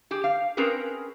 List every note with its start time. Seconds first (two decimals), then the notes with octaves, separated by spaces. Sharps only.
0.11 G4 G#4
0.24 F5
0.57 C4 C#4 G#4 A#4 B4